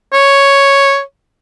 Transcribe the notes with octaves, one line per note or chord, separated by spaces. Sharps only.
C#5